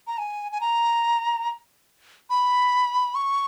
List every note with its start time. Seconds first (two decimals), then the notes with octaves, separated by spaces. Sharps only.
0.07 A#5
0.18 G#5
0.52 G#5
0.61 A#5
2.30 B5
3.15 C#6